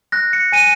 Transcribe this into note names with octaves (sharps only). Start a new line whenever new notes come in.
F#6 A#6
C#7
G#5 D#7